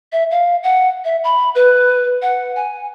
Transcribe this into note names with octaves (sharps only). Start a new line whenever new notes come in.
E5
F5
F#5
E5
B5
B4
F#5
G#5